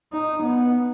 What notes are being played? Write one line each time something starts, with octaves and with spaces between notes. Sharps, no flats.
D#4
B3